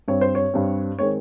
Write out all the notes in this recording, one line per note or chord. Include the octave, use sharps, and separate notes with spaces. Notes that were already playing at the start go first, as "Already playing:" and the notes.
G2 G3 C4 C#5
C5
C#5
G2 G3 C4
D#3 G#3 C4 C#5